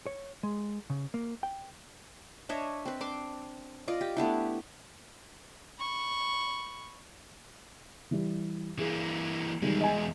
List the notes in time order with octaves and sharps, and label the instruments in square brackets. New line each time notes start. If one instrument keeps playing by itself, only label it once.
[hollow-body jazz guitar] C#5
G#3
C#3
A#3
G5
[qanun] D4 C#5 D#5 E5
C4 B4
D4 C6 D6
F4 D5 D#5
G4
A3 B3 D4 E4
[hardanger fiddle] B5 C#6
[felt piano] E3 G3
[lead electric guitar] E3 A#3 [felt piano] G#4
[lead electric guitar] E2 G#3 [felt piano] D#3 G3
[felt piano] D#5 G#5